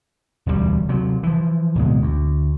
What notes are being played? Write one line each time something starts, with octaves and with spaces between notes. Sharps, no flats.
E1 D2 A2 G3
C3 F#3
E3 F3
D1 B2 G#3
D2